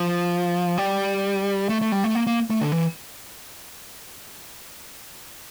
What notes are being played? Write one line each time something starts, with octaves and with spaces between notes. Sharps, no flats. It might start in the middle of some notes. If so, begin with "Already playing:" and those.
Already playing: F3
G3
A3
A3
G3
A3
A#3
A#3
A3
D3
E3